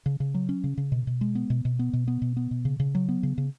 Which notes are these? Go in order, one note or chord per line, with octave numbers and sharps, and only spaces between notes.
C#3
C#3
F#3
C#4
C#3
C#3
B2
B2
G#3
B3
B2
B2
B3
B2
B3
B2
B3
B2
C#3
C#3
F#3
B3
C#3
C#3